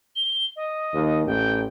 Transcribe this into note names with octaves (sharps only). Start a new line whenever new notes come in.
G7
D#5
D#2
A1 G5